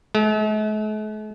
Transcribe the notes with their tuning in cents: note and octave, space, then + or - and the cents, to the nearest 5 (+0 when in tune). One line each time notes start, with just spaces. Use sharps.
A3 -45